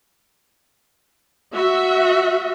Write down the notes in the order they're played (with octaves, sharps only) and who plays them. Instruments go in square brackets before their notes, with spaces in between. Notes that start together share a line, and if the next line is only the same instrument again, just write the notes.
[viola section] F#4 E5